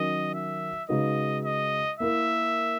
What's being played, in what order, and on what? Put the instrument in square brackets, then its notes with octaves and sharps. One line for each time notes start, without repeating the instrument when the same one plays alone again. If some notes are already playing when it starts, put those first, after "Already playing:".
Already playing: [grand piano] D#3 F#3 C#4 F#4 A#4 [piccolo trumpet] D#5
[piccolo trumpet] E5
[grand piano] C#3 G#3 D#4 F#4 B4 [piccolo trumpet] D#5
[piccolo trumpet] D#5
[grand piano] A#3 E4 A#4 [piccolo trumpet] E5